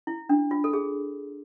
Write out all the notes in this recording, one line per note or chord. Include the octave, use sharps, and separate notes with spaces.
E4
D4
F4
A4
G#4